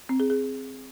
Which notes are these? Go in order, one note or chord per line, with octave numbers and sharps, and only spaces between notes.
C4
G#4
G#4